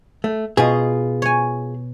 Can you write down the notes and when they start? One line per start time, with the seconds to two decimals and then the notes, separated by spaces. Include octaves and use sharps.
0.24 A3
0.57 B2 F4 G#4
1.22 C#5 G#5